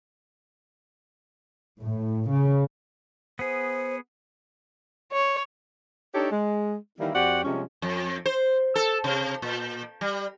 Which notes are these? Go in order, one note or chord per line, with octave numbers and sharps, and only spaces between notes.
A2
C#3
B3 G#4 C5
C#5
D4 D#4 G4 A4 C#5
G#3
D#3 E3 G3 A#3 E4
F2 C4 F#4 G4 D5 F#5
C3 F3 G3 G#3 C#4
F2
C5
A4
C3
A#2
G3